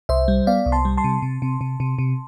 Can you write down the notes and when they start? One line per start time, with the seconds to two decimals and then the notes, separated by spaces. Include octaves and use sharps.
0.09 C2 C5 E5
0.28 G3
0.47 B3 D5 F5
0.66 C2
0.72 A5 C6
0.85 G3
0.97 A5 C6
1.04 C3
1.22 C3
1.42 C3
1.61 C3
1.80 C3
1.98 C3